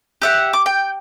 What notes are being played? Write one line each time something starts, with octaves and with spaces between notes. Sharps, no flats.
G4 E5 F#5
D6
G5